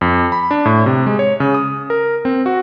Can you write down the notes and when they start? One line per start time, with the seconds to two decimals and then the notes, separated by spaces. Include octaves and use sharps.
0.01 F2
0.32 B5
0.51 D4
0.65 A2
0.86 C3
1.06 G#3
1.19 C#5
1.40 C#3
1.54 D#6
1.90 A#4
2.25 C4
2.46 F#4